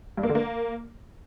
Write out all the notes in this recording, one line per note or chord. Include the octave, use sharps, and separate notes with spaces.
G2
A#3
D3
A#3